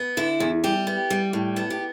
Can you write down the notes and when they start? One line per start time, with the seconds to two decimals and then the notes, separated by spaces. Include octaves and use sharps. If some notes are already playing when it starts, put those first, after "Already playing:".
Already playing: B3
0.17 D3 E4
0.40 E2
0.64 G3 G4
0.87 B3
1.10 G3
1.33 A2
1.56 B3 A4
1.70 G4